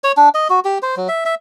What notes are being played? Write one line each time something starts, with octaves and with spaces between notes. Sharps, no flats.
C#5
D4
D#5
F#4
G4
C5
F#3
E5
E5